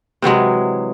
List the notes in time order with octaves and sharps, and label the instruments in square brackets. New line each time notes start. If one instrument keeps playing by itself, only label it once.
[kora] C3 E3 F#3 G#3